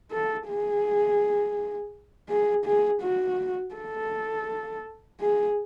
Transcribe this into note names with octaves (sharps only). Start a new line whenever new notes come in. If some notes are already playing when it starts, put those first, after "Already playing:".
A4
G#4
G#4
G#4
F#4
A4
G#4